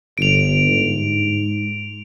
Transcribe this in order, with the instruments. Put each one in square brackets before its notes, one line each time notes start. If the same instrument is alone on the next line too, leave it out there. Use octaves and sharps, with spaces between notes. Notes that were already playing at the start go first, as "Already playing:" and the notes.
[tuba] G1 [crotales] D7 F7
[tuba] G#2